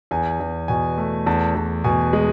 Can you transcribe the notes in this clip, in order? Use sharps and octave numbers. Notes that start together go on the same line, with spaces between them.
E2 G#5
E2
B2 G#5
A3
E2 A5
E2
B2 G#5
G#3